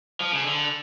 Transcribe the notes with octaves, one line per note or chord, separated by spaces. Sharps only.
F3
C#3
D3